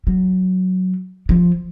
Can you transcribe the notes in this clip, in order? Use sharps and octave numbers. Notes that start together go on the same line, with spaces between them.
F#3
F3